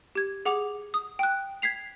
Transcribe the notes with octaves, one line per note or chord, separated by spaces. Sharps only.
G4 G#6
G#4 F#5 D6 F7
D#6
G5 F#6
G#6 B6 C7 F7